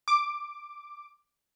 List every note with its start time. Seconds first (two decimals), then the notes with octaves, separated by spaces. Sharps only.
0.08 D6